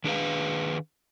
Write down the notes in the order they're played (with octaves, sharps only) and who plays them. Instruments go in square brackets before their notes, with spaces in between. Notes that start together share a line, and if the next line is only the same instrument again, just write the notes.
[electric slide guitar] D#3 D4 G#4 A4 B4 F5